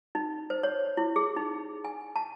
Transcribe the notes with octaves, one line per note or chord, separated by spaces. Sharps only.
D#4
C5
C#5
E4
G#4
D#4
G#5
A5